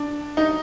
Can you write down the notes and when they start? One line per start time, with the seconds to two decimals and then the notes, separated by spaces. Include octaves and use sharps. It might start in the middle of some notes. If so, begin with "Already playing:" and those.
Already playing: D4
0.37 D#4